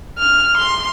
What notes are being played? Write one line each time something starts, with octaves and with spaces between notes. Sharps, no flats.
F6
C6